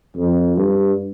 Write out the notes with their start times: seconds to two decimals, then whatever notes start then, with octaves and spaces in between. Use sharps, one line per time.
0.17 F2
0.57 G2